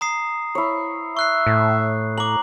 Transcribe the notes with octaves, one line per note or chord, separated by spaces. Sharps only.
A#5 D#6 C7
E4 C#5
E5 C#6 F#6 C7
A2
A#5 D6 F#7